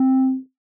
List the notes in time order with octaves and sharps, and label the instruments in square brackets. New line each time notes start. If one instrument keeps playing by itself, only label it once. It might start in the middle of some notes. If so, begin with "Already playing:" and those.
Already playing: [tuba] C4